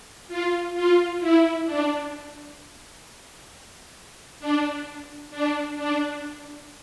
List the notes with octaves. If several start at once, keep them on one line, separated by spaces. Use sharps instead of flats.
F4
F4
E4
D4
D4
D4
D4